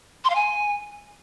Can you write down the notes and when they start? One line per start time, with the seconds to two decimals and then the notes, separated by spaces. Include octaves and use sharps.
0.24 C6
0.30 F5
0.35 G#5